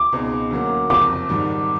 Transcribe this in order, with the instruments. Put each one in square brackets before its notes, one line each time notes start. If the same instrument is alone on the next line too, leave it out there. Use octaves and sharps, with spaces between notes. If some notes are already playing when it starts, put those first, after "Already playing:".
Already playing: [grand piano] D6
[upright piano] C#2 B2 G#3 C4 D#4
D2 C#3 F#3 A#3
[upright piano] F#1 F2 C3 [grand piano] D6
[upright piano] G#1 G#2 D#3 G3